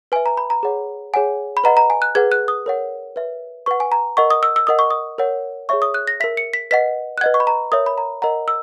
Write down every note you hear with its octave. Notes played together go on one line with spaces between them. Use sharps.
B4 E5 G#5
A#5
B5
A#5
G#4 C#5 F#5
G#4 C#5 F#5 G#5
B5
B4 D#5 F#5 A#5
A#5
G#5
F#6
G#4 B4 F#5 G#6
F#6
D#6
A#4 C#5 F#5
B4 E5
B4 F#5 C#6
G#5
A#5
A#4 D#5 F#5 C#6
D#6
E6
E6
A#4 D#5 F#5 D#6
C#6
D#6
A#4 C#5 F#5
G#4 C#5 E5 C#6
D#6
F#6
A#6
A#4 E5 B6
C#7
B6
B4 D#5 F#5 B6
F#6
B4 D#5 F#5 G#6
C#6
B5
A#5
A#4 C#5 E5 D#6
B5
A#5
A#4 D#5 F#5 A#5
E6